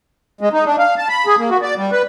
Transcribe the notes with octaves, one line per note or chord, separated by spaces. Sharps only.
G#3
D#4
D4
F5
A5
B5
G#4
A#3
F#4
D5
G3
B4